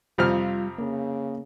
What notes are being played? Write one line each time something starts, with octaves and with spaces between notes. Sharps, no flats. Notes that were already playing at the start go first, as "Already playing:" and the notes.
F2 C3 G3 F4 F6
C#3 A#3